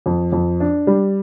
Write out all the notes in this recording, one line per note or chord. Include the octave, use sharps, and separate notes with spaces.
F2
F2
D4
G3